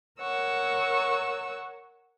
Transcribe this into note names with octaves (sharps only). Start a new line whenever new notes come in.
A#4 C#5 F#5 C#6 E6